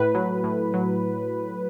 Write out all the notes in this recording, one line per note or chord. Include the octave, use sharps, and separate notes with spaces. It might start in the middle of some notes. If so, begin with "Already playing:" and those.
Already playing: A2 B4
F#3
A2
F#3